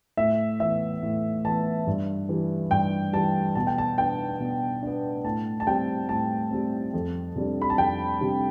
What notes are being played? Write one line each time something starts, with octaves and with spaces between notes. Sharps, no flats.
A2 E5
E3 B3 E5
A2
E3 B3 A5
G2
E3 G3
G2 G5
E3 G3 A5
B2 A5
G5
A5
B3 D4 G5
B2
B3 D4
A2 A5
A5
G3 C4 G5
A2 A5
G3 C4
F2
C3 G3 D4
B5
A5
F2 G5
C3 G3 D4